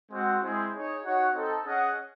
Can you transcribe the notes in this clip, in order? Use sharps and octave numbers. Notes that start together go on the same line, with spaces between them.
G#3 C4 F#4 C5 F#5
G#3 C4 E4 G#4 C5
D#4 G#4 C#5
D#4 F#4 C#5 F#5
C4 D#4 A4
C#4 G#4 D#5 F#5